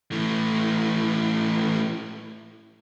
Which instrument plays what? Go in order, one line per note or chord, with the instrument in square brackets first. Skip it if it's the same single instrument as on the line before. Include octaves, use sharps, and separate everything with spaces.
[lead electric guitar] A2 E3